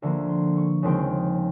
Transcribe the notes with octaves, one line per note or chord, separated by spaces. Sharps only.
D2 D3 F3 A#3
C6
C#6
D#2 C#3 F3 G#3 C4 G5